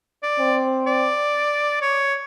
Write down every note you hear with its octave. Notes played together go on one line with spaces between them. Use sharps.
D5
C4
D5
C#5